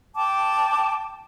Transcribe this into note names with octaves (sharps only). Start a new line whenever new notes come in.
G5 A5 D6